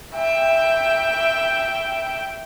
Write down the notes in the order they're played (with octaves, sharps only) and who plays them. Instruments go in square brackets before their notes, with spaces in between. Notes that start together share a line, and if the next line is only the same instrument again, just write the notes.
[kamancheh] E5 G5